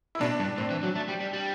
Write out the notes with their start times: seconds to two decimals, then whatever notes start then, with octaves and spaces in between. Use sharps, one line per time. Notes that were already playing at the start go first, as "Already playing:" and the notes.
0.15 E4
0.21 B2 D4
0.39 G2
0.58 A2 C4
0.71 E3
0.83 F#3
0.95 A3
1.08 G3
1.20 G3
1.33 G3